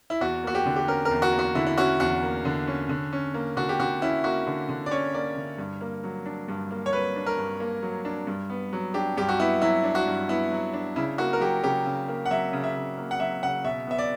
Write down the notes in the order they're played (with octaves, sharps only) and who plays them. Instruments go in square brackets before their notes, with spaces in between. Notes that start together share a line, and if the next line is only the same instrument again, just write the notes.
[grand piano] E4
E2 F#4
A#3 F#4
G4
D3
G4
C#4 A#4
A#4
E2
F#4
A#3
F#4
D3 E4
E4
C#4 F#4
E2 F#4
A#3
D3
C#4
D3
C#4
A#3
D3 F#4
G4
D3 F#4
C#4 E4
A#3 F#4
D3
D3
D5
C#4 C#5
A#3 D5
D3
G2
A#3
F#3
D4
G2
A#3
C#5
F#3 B4
D4
A#4
G2
A#3
F#3
D4
G2
B3
F#3
D4 G4
G2 G4
F#4
B3 E4
F#3 E4
D4
F#4
G2
B3 E4
F#3
D4
C#3 E4
A#3 F#4
A#4
F#3 G4
C#3 G4
C#3
A#3
F#5
F#3 E5
C#3
E5
C#3
A#3
F#5
F#3 E5
C#3 F#5
B2 E5
B3 E5
D5